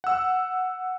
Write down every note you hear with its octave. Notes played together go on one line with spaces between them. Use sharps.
F#5 E6